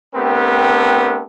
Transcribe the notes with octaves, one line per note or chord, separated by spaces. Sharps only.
A3 B3 C4 D4 G4 A#4